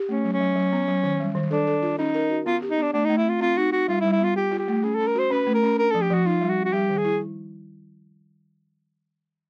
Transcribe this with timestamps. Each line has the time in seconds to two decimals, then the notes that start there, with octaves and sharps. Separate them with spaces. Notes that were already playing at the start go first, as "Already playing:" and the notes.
Already playing: G4
0.09 A3 C#4
0.24 F#3
0.33 C#4
0.40 F#3
0.56 F#3
0.72 B3
0.88 F#3
1.03 D#3
1.20 G3
1.35 D#3
1.51 D4 A4
1.67 A4
1.82 F4
1.98 C#4 D#4
2.14 A#4
2.30 F#4
2.46 B3 F4
2.62 G4
2.70 D#4
2.78 B3 D4
2.93 A3 D4
3.05 A3 D#4
3.18 E4
3.25 C4 F4
3.40 C4 F4
3.57 D#4 F#4
3.73 D#4 F#4
3.88 G3 F4
4.01 E4
4.04 G3
4.12 E4
4.20 B3 F4
4.36 F4 G4
4.51 F4
4.59 G4
4.68 A3
4.83 C#4 G#4
4.95 C#4 A4
5.07 A#4
5.15 F#4 C5
5.31 C#4 B4
5.47 A3
5.54 A#4
5.63 C#4
5.78 D4 A#4
5.91 F3 A4
6.02 G4
6.10 F3 F#4
6.25 D#4 F4
6.41 G3
6.50 F#4
6.57 C4
6.65 F#4
6.73 G3 G4
6.89 D#3
6.98 G#4
7.05 E4